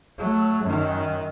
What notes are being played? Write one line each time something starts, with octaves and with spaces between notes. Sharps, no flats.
F#3 A3
F#2 D#3